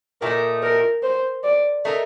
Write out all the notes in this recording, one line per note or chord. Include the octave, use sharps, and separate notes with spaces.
A#2 A3 D#4 A#4
A#4
C5
D5
A3 D#4 A#4